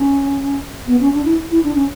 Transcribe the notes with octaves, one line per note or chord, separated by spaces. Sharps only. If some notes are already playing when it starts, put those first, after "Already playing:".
Already playing: C#4
B3
C#4
D4
E4
E4
D4
C#4